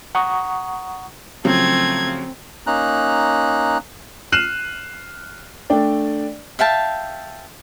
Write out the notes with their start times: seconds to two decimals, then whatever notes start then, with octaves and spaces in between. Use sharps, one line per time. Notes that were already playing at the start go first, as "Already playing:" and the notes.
0.15 F#5 A#5 C#6 D#6
1.45 C#3 F3 F#3 A3 C4 G#6
2.67 A#3 C#4 D#4 A#5 F#6
4.32 F6 F#6 C7 D#7 E7 F#7
5.70 A3 D4 D5 G5
6.59 E5 F5 G5 A5